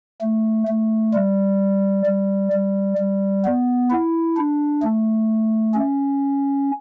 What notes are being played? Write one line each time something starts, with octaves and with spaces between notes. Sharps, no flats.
A3
A3
G3
G3
G3
G3
B3
E4
D4
A3
C#4